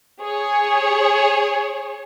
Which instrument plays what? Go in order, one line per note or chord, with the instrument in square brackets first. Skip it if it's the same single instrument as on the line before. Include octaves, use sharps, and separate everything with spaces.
[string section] G#4 C#5